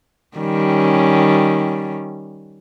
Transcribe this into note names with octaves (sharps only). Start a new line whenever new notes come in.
D#3 G3 C#4